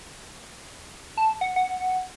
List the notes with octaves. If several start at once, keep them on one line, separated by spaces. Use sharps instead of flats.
A5
F#5
F#5